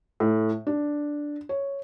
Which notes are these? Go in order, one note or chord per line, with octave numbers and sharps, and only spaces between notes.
A2
D4
C#5